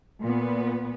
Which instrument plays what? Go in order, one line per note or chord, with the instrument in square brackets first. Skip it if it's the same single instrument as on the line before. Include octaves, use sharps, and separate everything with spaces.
[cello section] A#2 B3 B4